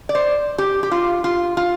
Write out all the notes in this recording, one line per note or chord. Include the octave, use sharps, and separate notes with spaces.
D5
C5
G4
G4
F4
F4
F4